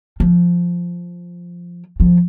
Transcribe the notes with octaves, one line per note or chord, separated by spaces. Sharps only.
F3
F3